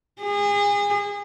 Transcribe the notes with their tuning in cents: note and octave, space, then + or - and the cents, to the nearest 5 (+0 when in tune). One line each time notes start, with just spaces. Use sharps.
G#4 -30